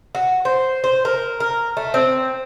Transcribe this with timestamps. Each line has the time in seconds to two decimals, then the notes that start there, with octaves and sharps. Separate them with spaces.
0.15 F#4
0.45 C5
0.84 C5
1.05 A#4
1.40 A#4
1.77 A3
1.94 C4